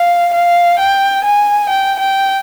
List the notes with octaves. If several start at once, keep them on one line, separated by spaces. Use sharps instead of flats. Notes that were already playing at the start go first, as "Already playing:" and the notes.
Already playing: F5
F5
G5
G#5
G5
G5